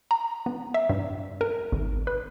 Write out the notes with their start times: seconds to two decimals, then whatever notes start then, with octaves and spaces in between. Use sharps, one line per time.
0.11 A#5
0.46 B3
0.74 E5
0.89 G2
1.41 A#4
1.72 G#1
2.07 B4